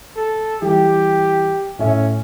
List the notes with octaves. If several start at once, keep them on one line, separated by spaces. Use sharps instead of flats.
A4
E3 G3 G4
A2 C#4 E5